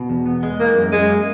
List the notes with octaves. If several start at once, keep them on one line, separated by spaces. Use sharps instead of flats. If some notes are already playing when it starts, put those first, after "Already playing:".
Already playing: B2
E2
B3
G#3
E3 A#3
F#2
F#2 G#3
A#3